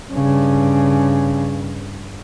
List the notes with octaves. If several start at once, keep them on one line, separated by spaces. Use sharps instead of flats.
G2 C#3